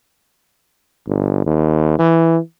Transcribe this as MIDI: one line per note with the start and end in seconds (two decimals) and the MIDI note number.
1.07 1.43 31
1.46 1.99 39
1.99 2.38 52